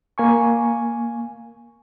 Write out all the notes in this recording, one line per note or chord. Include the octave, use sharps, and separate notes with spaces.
A#3 G#5 C#6